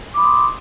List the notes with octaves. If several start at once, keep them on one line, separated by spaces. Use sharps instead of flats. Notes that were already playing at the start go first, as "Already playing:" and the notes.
B5 C6 D6 D#6